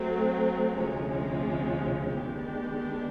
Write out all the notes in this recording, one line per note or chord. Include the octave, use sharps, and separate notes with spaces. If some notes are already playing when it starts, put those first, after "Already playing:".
Already playing: F#3 A3 C4
D2 C3 F3 G#3 C#4
D#3 G#3 B3 D4 G4